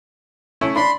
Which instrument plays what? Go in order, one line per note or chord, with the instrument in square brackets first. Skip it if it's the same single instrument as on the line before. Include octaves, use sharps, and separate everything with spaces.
[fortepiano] A3 C#4 E4
[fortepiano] D4 [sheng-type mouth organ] B5 C6